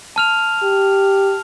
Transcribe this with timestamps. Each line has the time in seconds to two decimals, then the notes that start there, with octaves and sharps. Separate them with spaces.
0.16 A5 F6 F7
0.63 G4